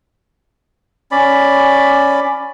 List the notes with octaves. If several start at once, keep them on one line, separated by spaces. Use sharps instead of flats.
C#4 D5 B5